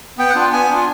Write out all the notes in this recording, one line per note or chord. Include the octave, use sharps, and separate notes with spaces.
B3 G5
F#5
D4 F4
G5
B3 G#5
D4 F4